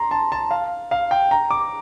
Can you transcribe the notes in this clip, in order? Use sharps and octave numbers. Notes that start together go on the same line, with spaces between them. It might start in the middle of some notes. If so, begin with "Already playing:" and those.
Already playing: A#5 C6
A5
A5
F5
F5
G5
A#5
D6